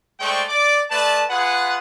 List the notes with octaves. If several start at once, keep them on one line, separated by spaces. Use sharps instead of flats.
G#3 A3 C5 D5 G5 C#6
D5 D6
A3 B4 D5 A5
F4 G#4 B4 F#5